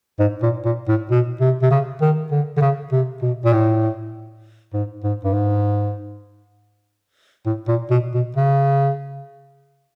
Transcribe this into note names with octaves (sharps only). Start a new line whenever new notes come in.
G#2
A#2
A#2
A2
B2
C3
C3
C#3
D#3
D3
D3
C#3
C3
B2
A#2
A2
G#2
G#2
G2
G#2
A2
A#2
B2
B2
C#3